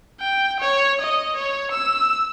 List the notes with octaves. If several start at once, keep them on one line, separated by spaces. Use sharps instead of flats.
G5
C#5
D#5
C#5
E6